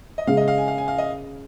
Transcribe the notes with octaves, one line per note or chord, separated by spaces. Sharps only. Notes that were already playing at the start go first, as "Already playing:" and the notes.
D#5
C#3 G#3 C#4 F5
D#5
F5
G#5
F5
G#5
F5
D#5